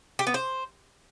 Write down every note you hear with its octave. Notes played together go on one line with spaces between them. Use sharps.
G4
B3
C5